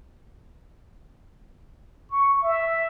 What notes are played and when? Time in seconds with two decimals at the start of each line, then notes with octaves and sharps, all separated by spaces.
2.11 C#6
2.43 E5